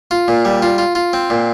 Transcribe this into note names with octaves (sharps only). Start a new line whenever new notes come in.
F4
A#2
G3
F4
F4
F4
C4
A#2